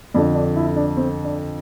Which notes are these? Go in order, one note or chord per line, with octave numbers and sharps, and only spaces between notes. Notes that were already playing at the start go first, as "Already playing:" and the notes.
F2 D3 D4
D4
E4
D4
C4
D4